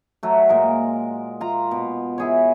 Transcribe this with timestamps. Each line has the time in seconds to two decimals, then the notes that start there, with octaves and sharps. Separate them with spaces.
0.23 F#3 A3
0.49 A#2 G#3 A#4
1.41 F4 A#5
1.71 B2
2.18 E4 G#4 C#5